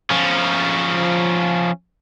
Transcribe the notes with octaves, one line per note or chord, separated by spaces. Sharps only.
F3 C#4